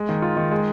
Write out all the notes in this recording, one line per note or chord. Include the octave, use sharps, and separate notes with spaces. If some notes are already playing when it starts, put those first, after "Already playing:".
Already playing: G#3
D#3
F4
D#3
G#3